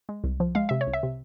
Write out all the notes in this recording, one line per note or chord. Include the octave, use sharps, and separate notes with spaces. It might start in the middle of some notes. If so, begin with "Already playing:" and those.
G#3
C2
F3
G#3 F5
C3 E5
C#5
C2
E5
C3